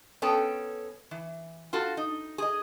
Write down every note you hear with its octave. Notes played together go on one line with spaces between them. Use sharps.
B3 C#4 A4 G5
E3
F4 F#4 A4
D#4
G#4 D#5